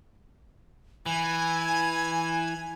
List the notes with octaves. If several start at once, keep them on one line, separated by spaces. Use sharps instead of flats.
E3 G#5